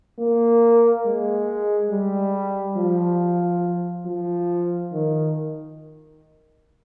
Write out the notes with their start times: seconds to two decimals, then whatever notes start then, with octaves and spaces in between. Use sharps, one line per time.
0.19 A#3
1.05 G#3
1.90 G3
2.77 F3
4.06 F3
4.92 D#3